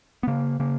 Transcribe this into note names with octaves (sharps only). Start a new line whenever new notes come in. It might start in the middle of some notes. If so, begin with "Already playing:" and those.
B3
C#3 A#3
C#3 A#3